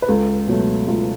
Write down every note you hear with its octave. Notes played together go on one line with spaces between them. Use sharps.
B4
C#2 A4
B2 F#3 A3
C#2 F4